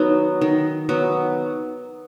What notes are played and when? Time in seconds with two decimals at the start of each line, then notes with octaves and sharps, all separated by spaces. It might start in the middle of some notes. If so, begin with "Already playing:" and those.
Already playing: D#3 F#3 B3 D#4
0.41 D#3
0.89 F#3 B3